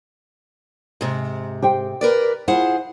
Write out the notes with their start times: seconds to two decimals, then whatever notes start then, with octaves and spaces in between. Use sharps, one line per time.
1.01 G#2 C3
1.62 G4 C5 G5
2.01 A#4 B4 D5
2.48 E4 F4 G#4 C5 F#5